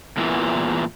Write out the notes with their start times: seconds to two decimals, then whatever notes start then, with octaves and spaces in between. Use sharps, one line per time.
0.17 E2 A#2 E3